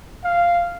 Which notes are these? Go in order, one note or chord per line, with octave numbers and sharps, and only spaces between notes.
F5